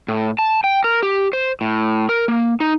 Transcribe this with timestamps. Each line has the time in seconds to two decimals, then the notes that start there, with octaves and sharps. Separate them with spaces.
0.08 A2
0.39 A5
0.64 G5
0.84 A#4
1.03 G4
1.33 C5
1.61 A2
2.09 A#4
2.28 A#3
2.60 D#4